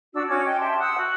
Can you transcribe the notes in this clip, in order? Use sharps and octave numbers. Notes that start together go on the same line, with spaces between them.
D4 F#4 E6
C#4 F#4 D6 G#6
D#5 G5
G4 E5 A5 C6
F#5 D#6 E6 F#6
F#4